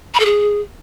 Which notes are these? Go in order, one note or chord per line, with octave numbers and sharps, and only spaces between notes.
B5
A4
G#4